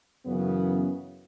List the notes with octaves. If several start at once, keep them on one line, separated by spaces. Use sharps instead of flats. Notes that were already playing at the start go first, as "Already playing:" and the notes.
F#2 C#3 E3 B3